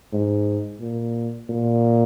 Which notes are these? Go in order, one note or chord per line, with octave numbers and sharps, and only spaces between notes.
G#2
A#2
A#2